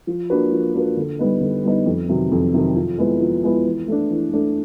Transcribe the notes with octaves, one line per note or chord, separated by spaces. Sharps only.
F3
A#3 D4 F#4 B4
F3
A#3 D4 F#4 B4
D3
G3 B3 D#4
D3
G3 B3 D#4
F2
C3 D#3 F#3
F2
C3 D#3 F#3
F3
G#3 B3 E4
F3
G#3 B3 E4
E3
A3 D4
E3
A3 D4